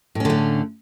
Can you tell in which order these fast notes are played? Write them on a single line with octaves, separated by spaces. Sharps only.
A2 C#4 D3 A3